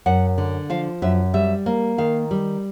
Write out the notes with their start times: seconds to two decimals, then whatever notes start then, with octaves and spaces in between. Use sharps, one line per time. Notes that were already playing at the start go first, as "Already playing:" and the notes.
0.06 F#2 F#5
0.38 D3
0.70 F3 F5
1.02 F#2 E5
1.34 G3 E5
1.66 A#3
1.98 D#3 F5
2.31 G3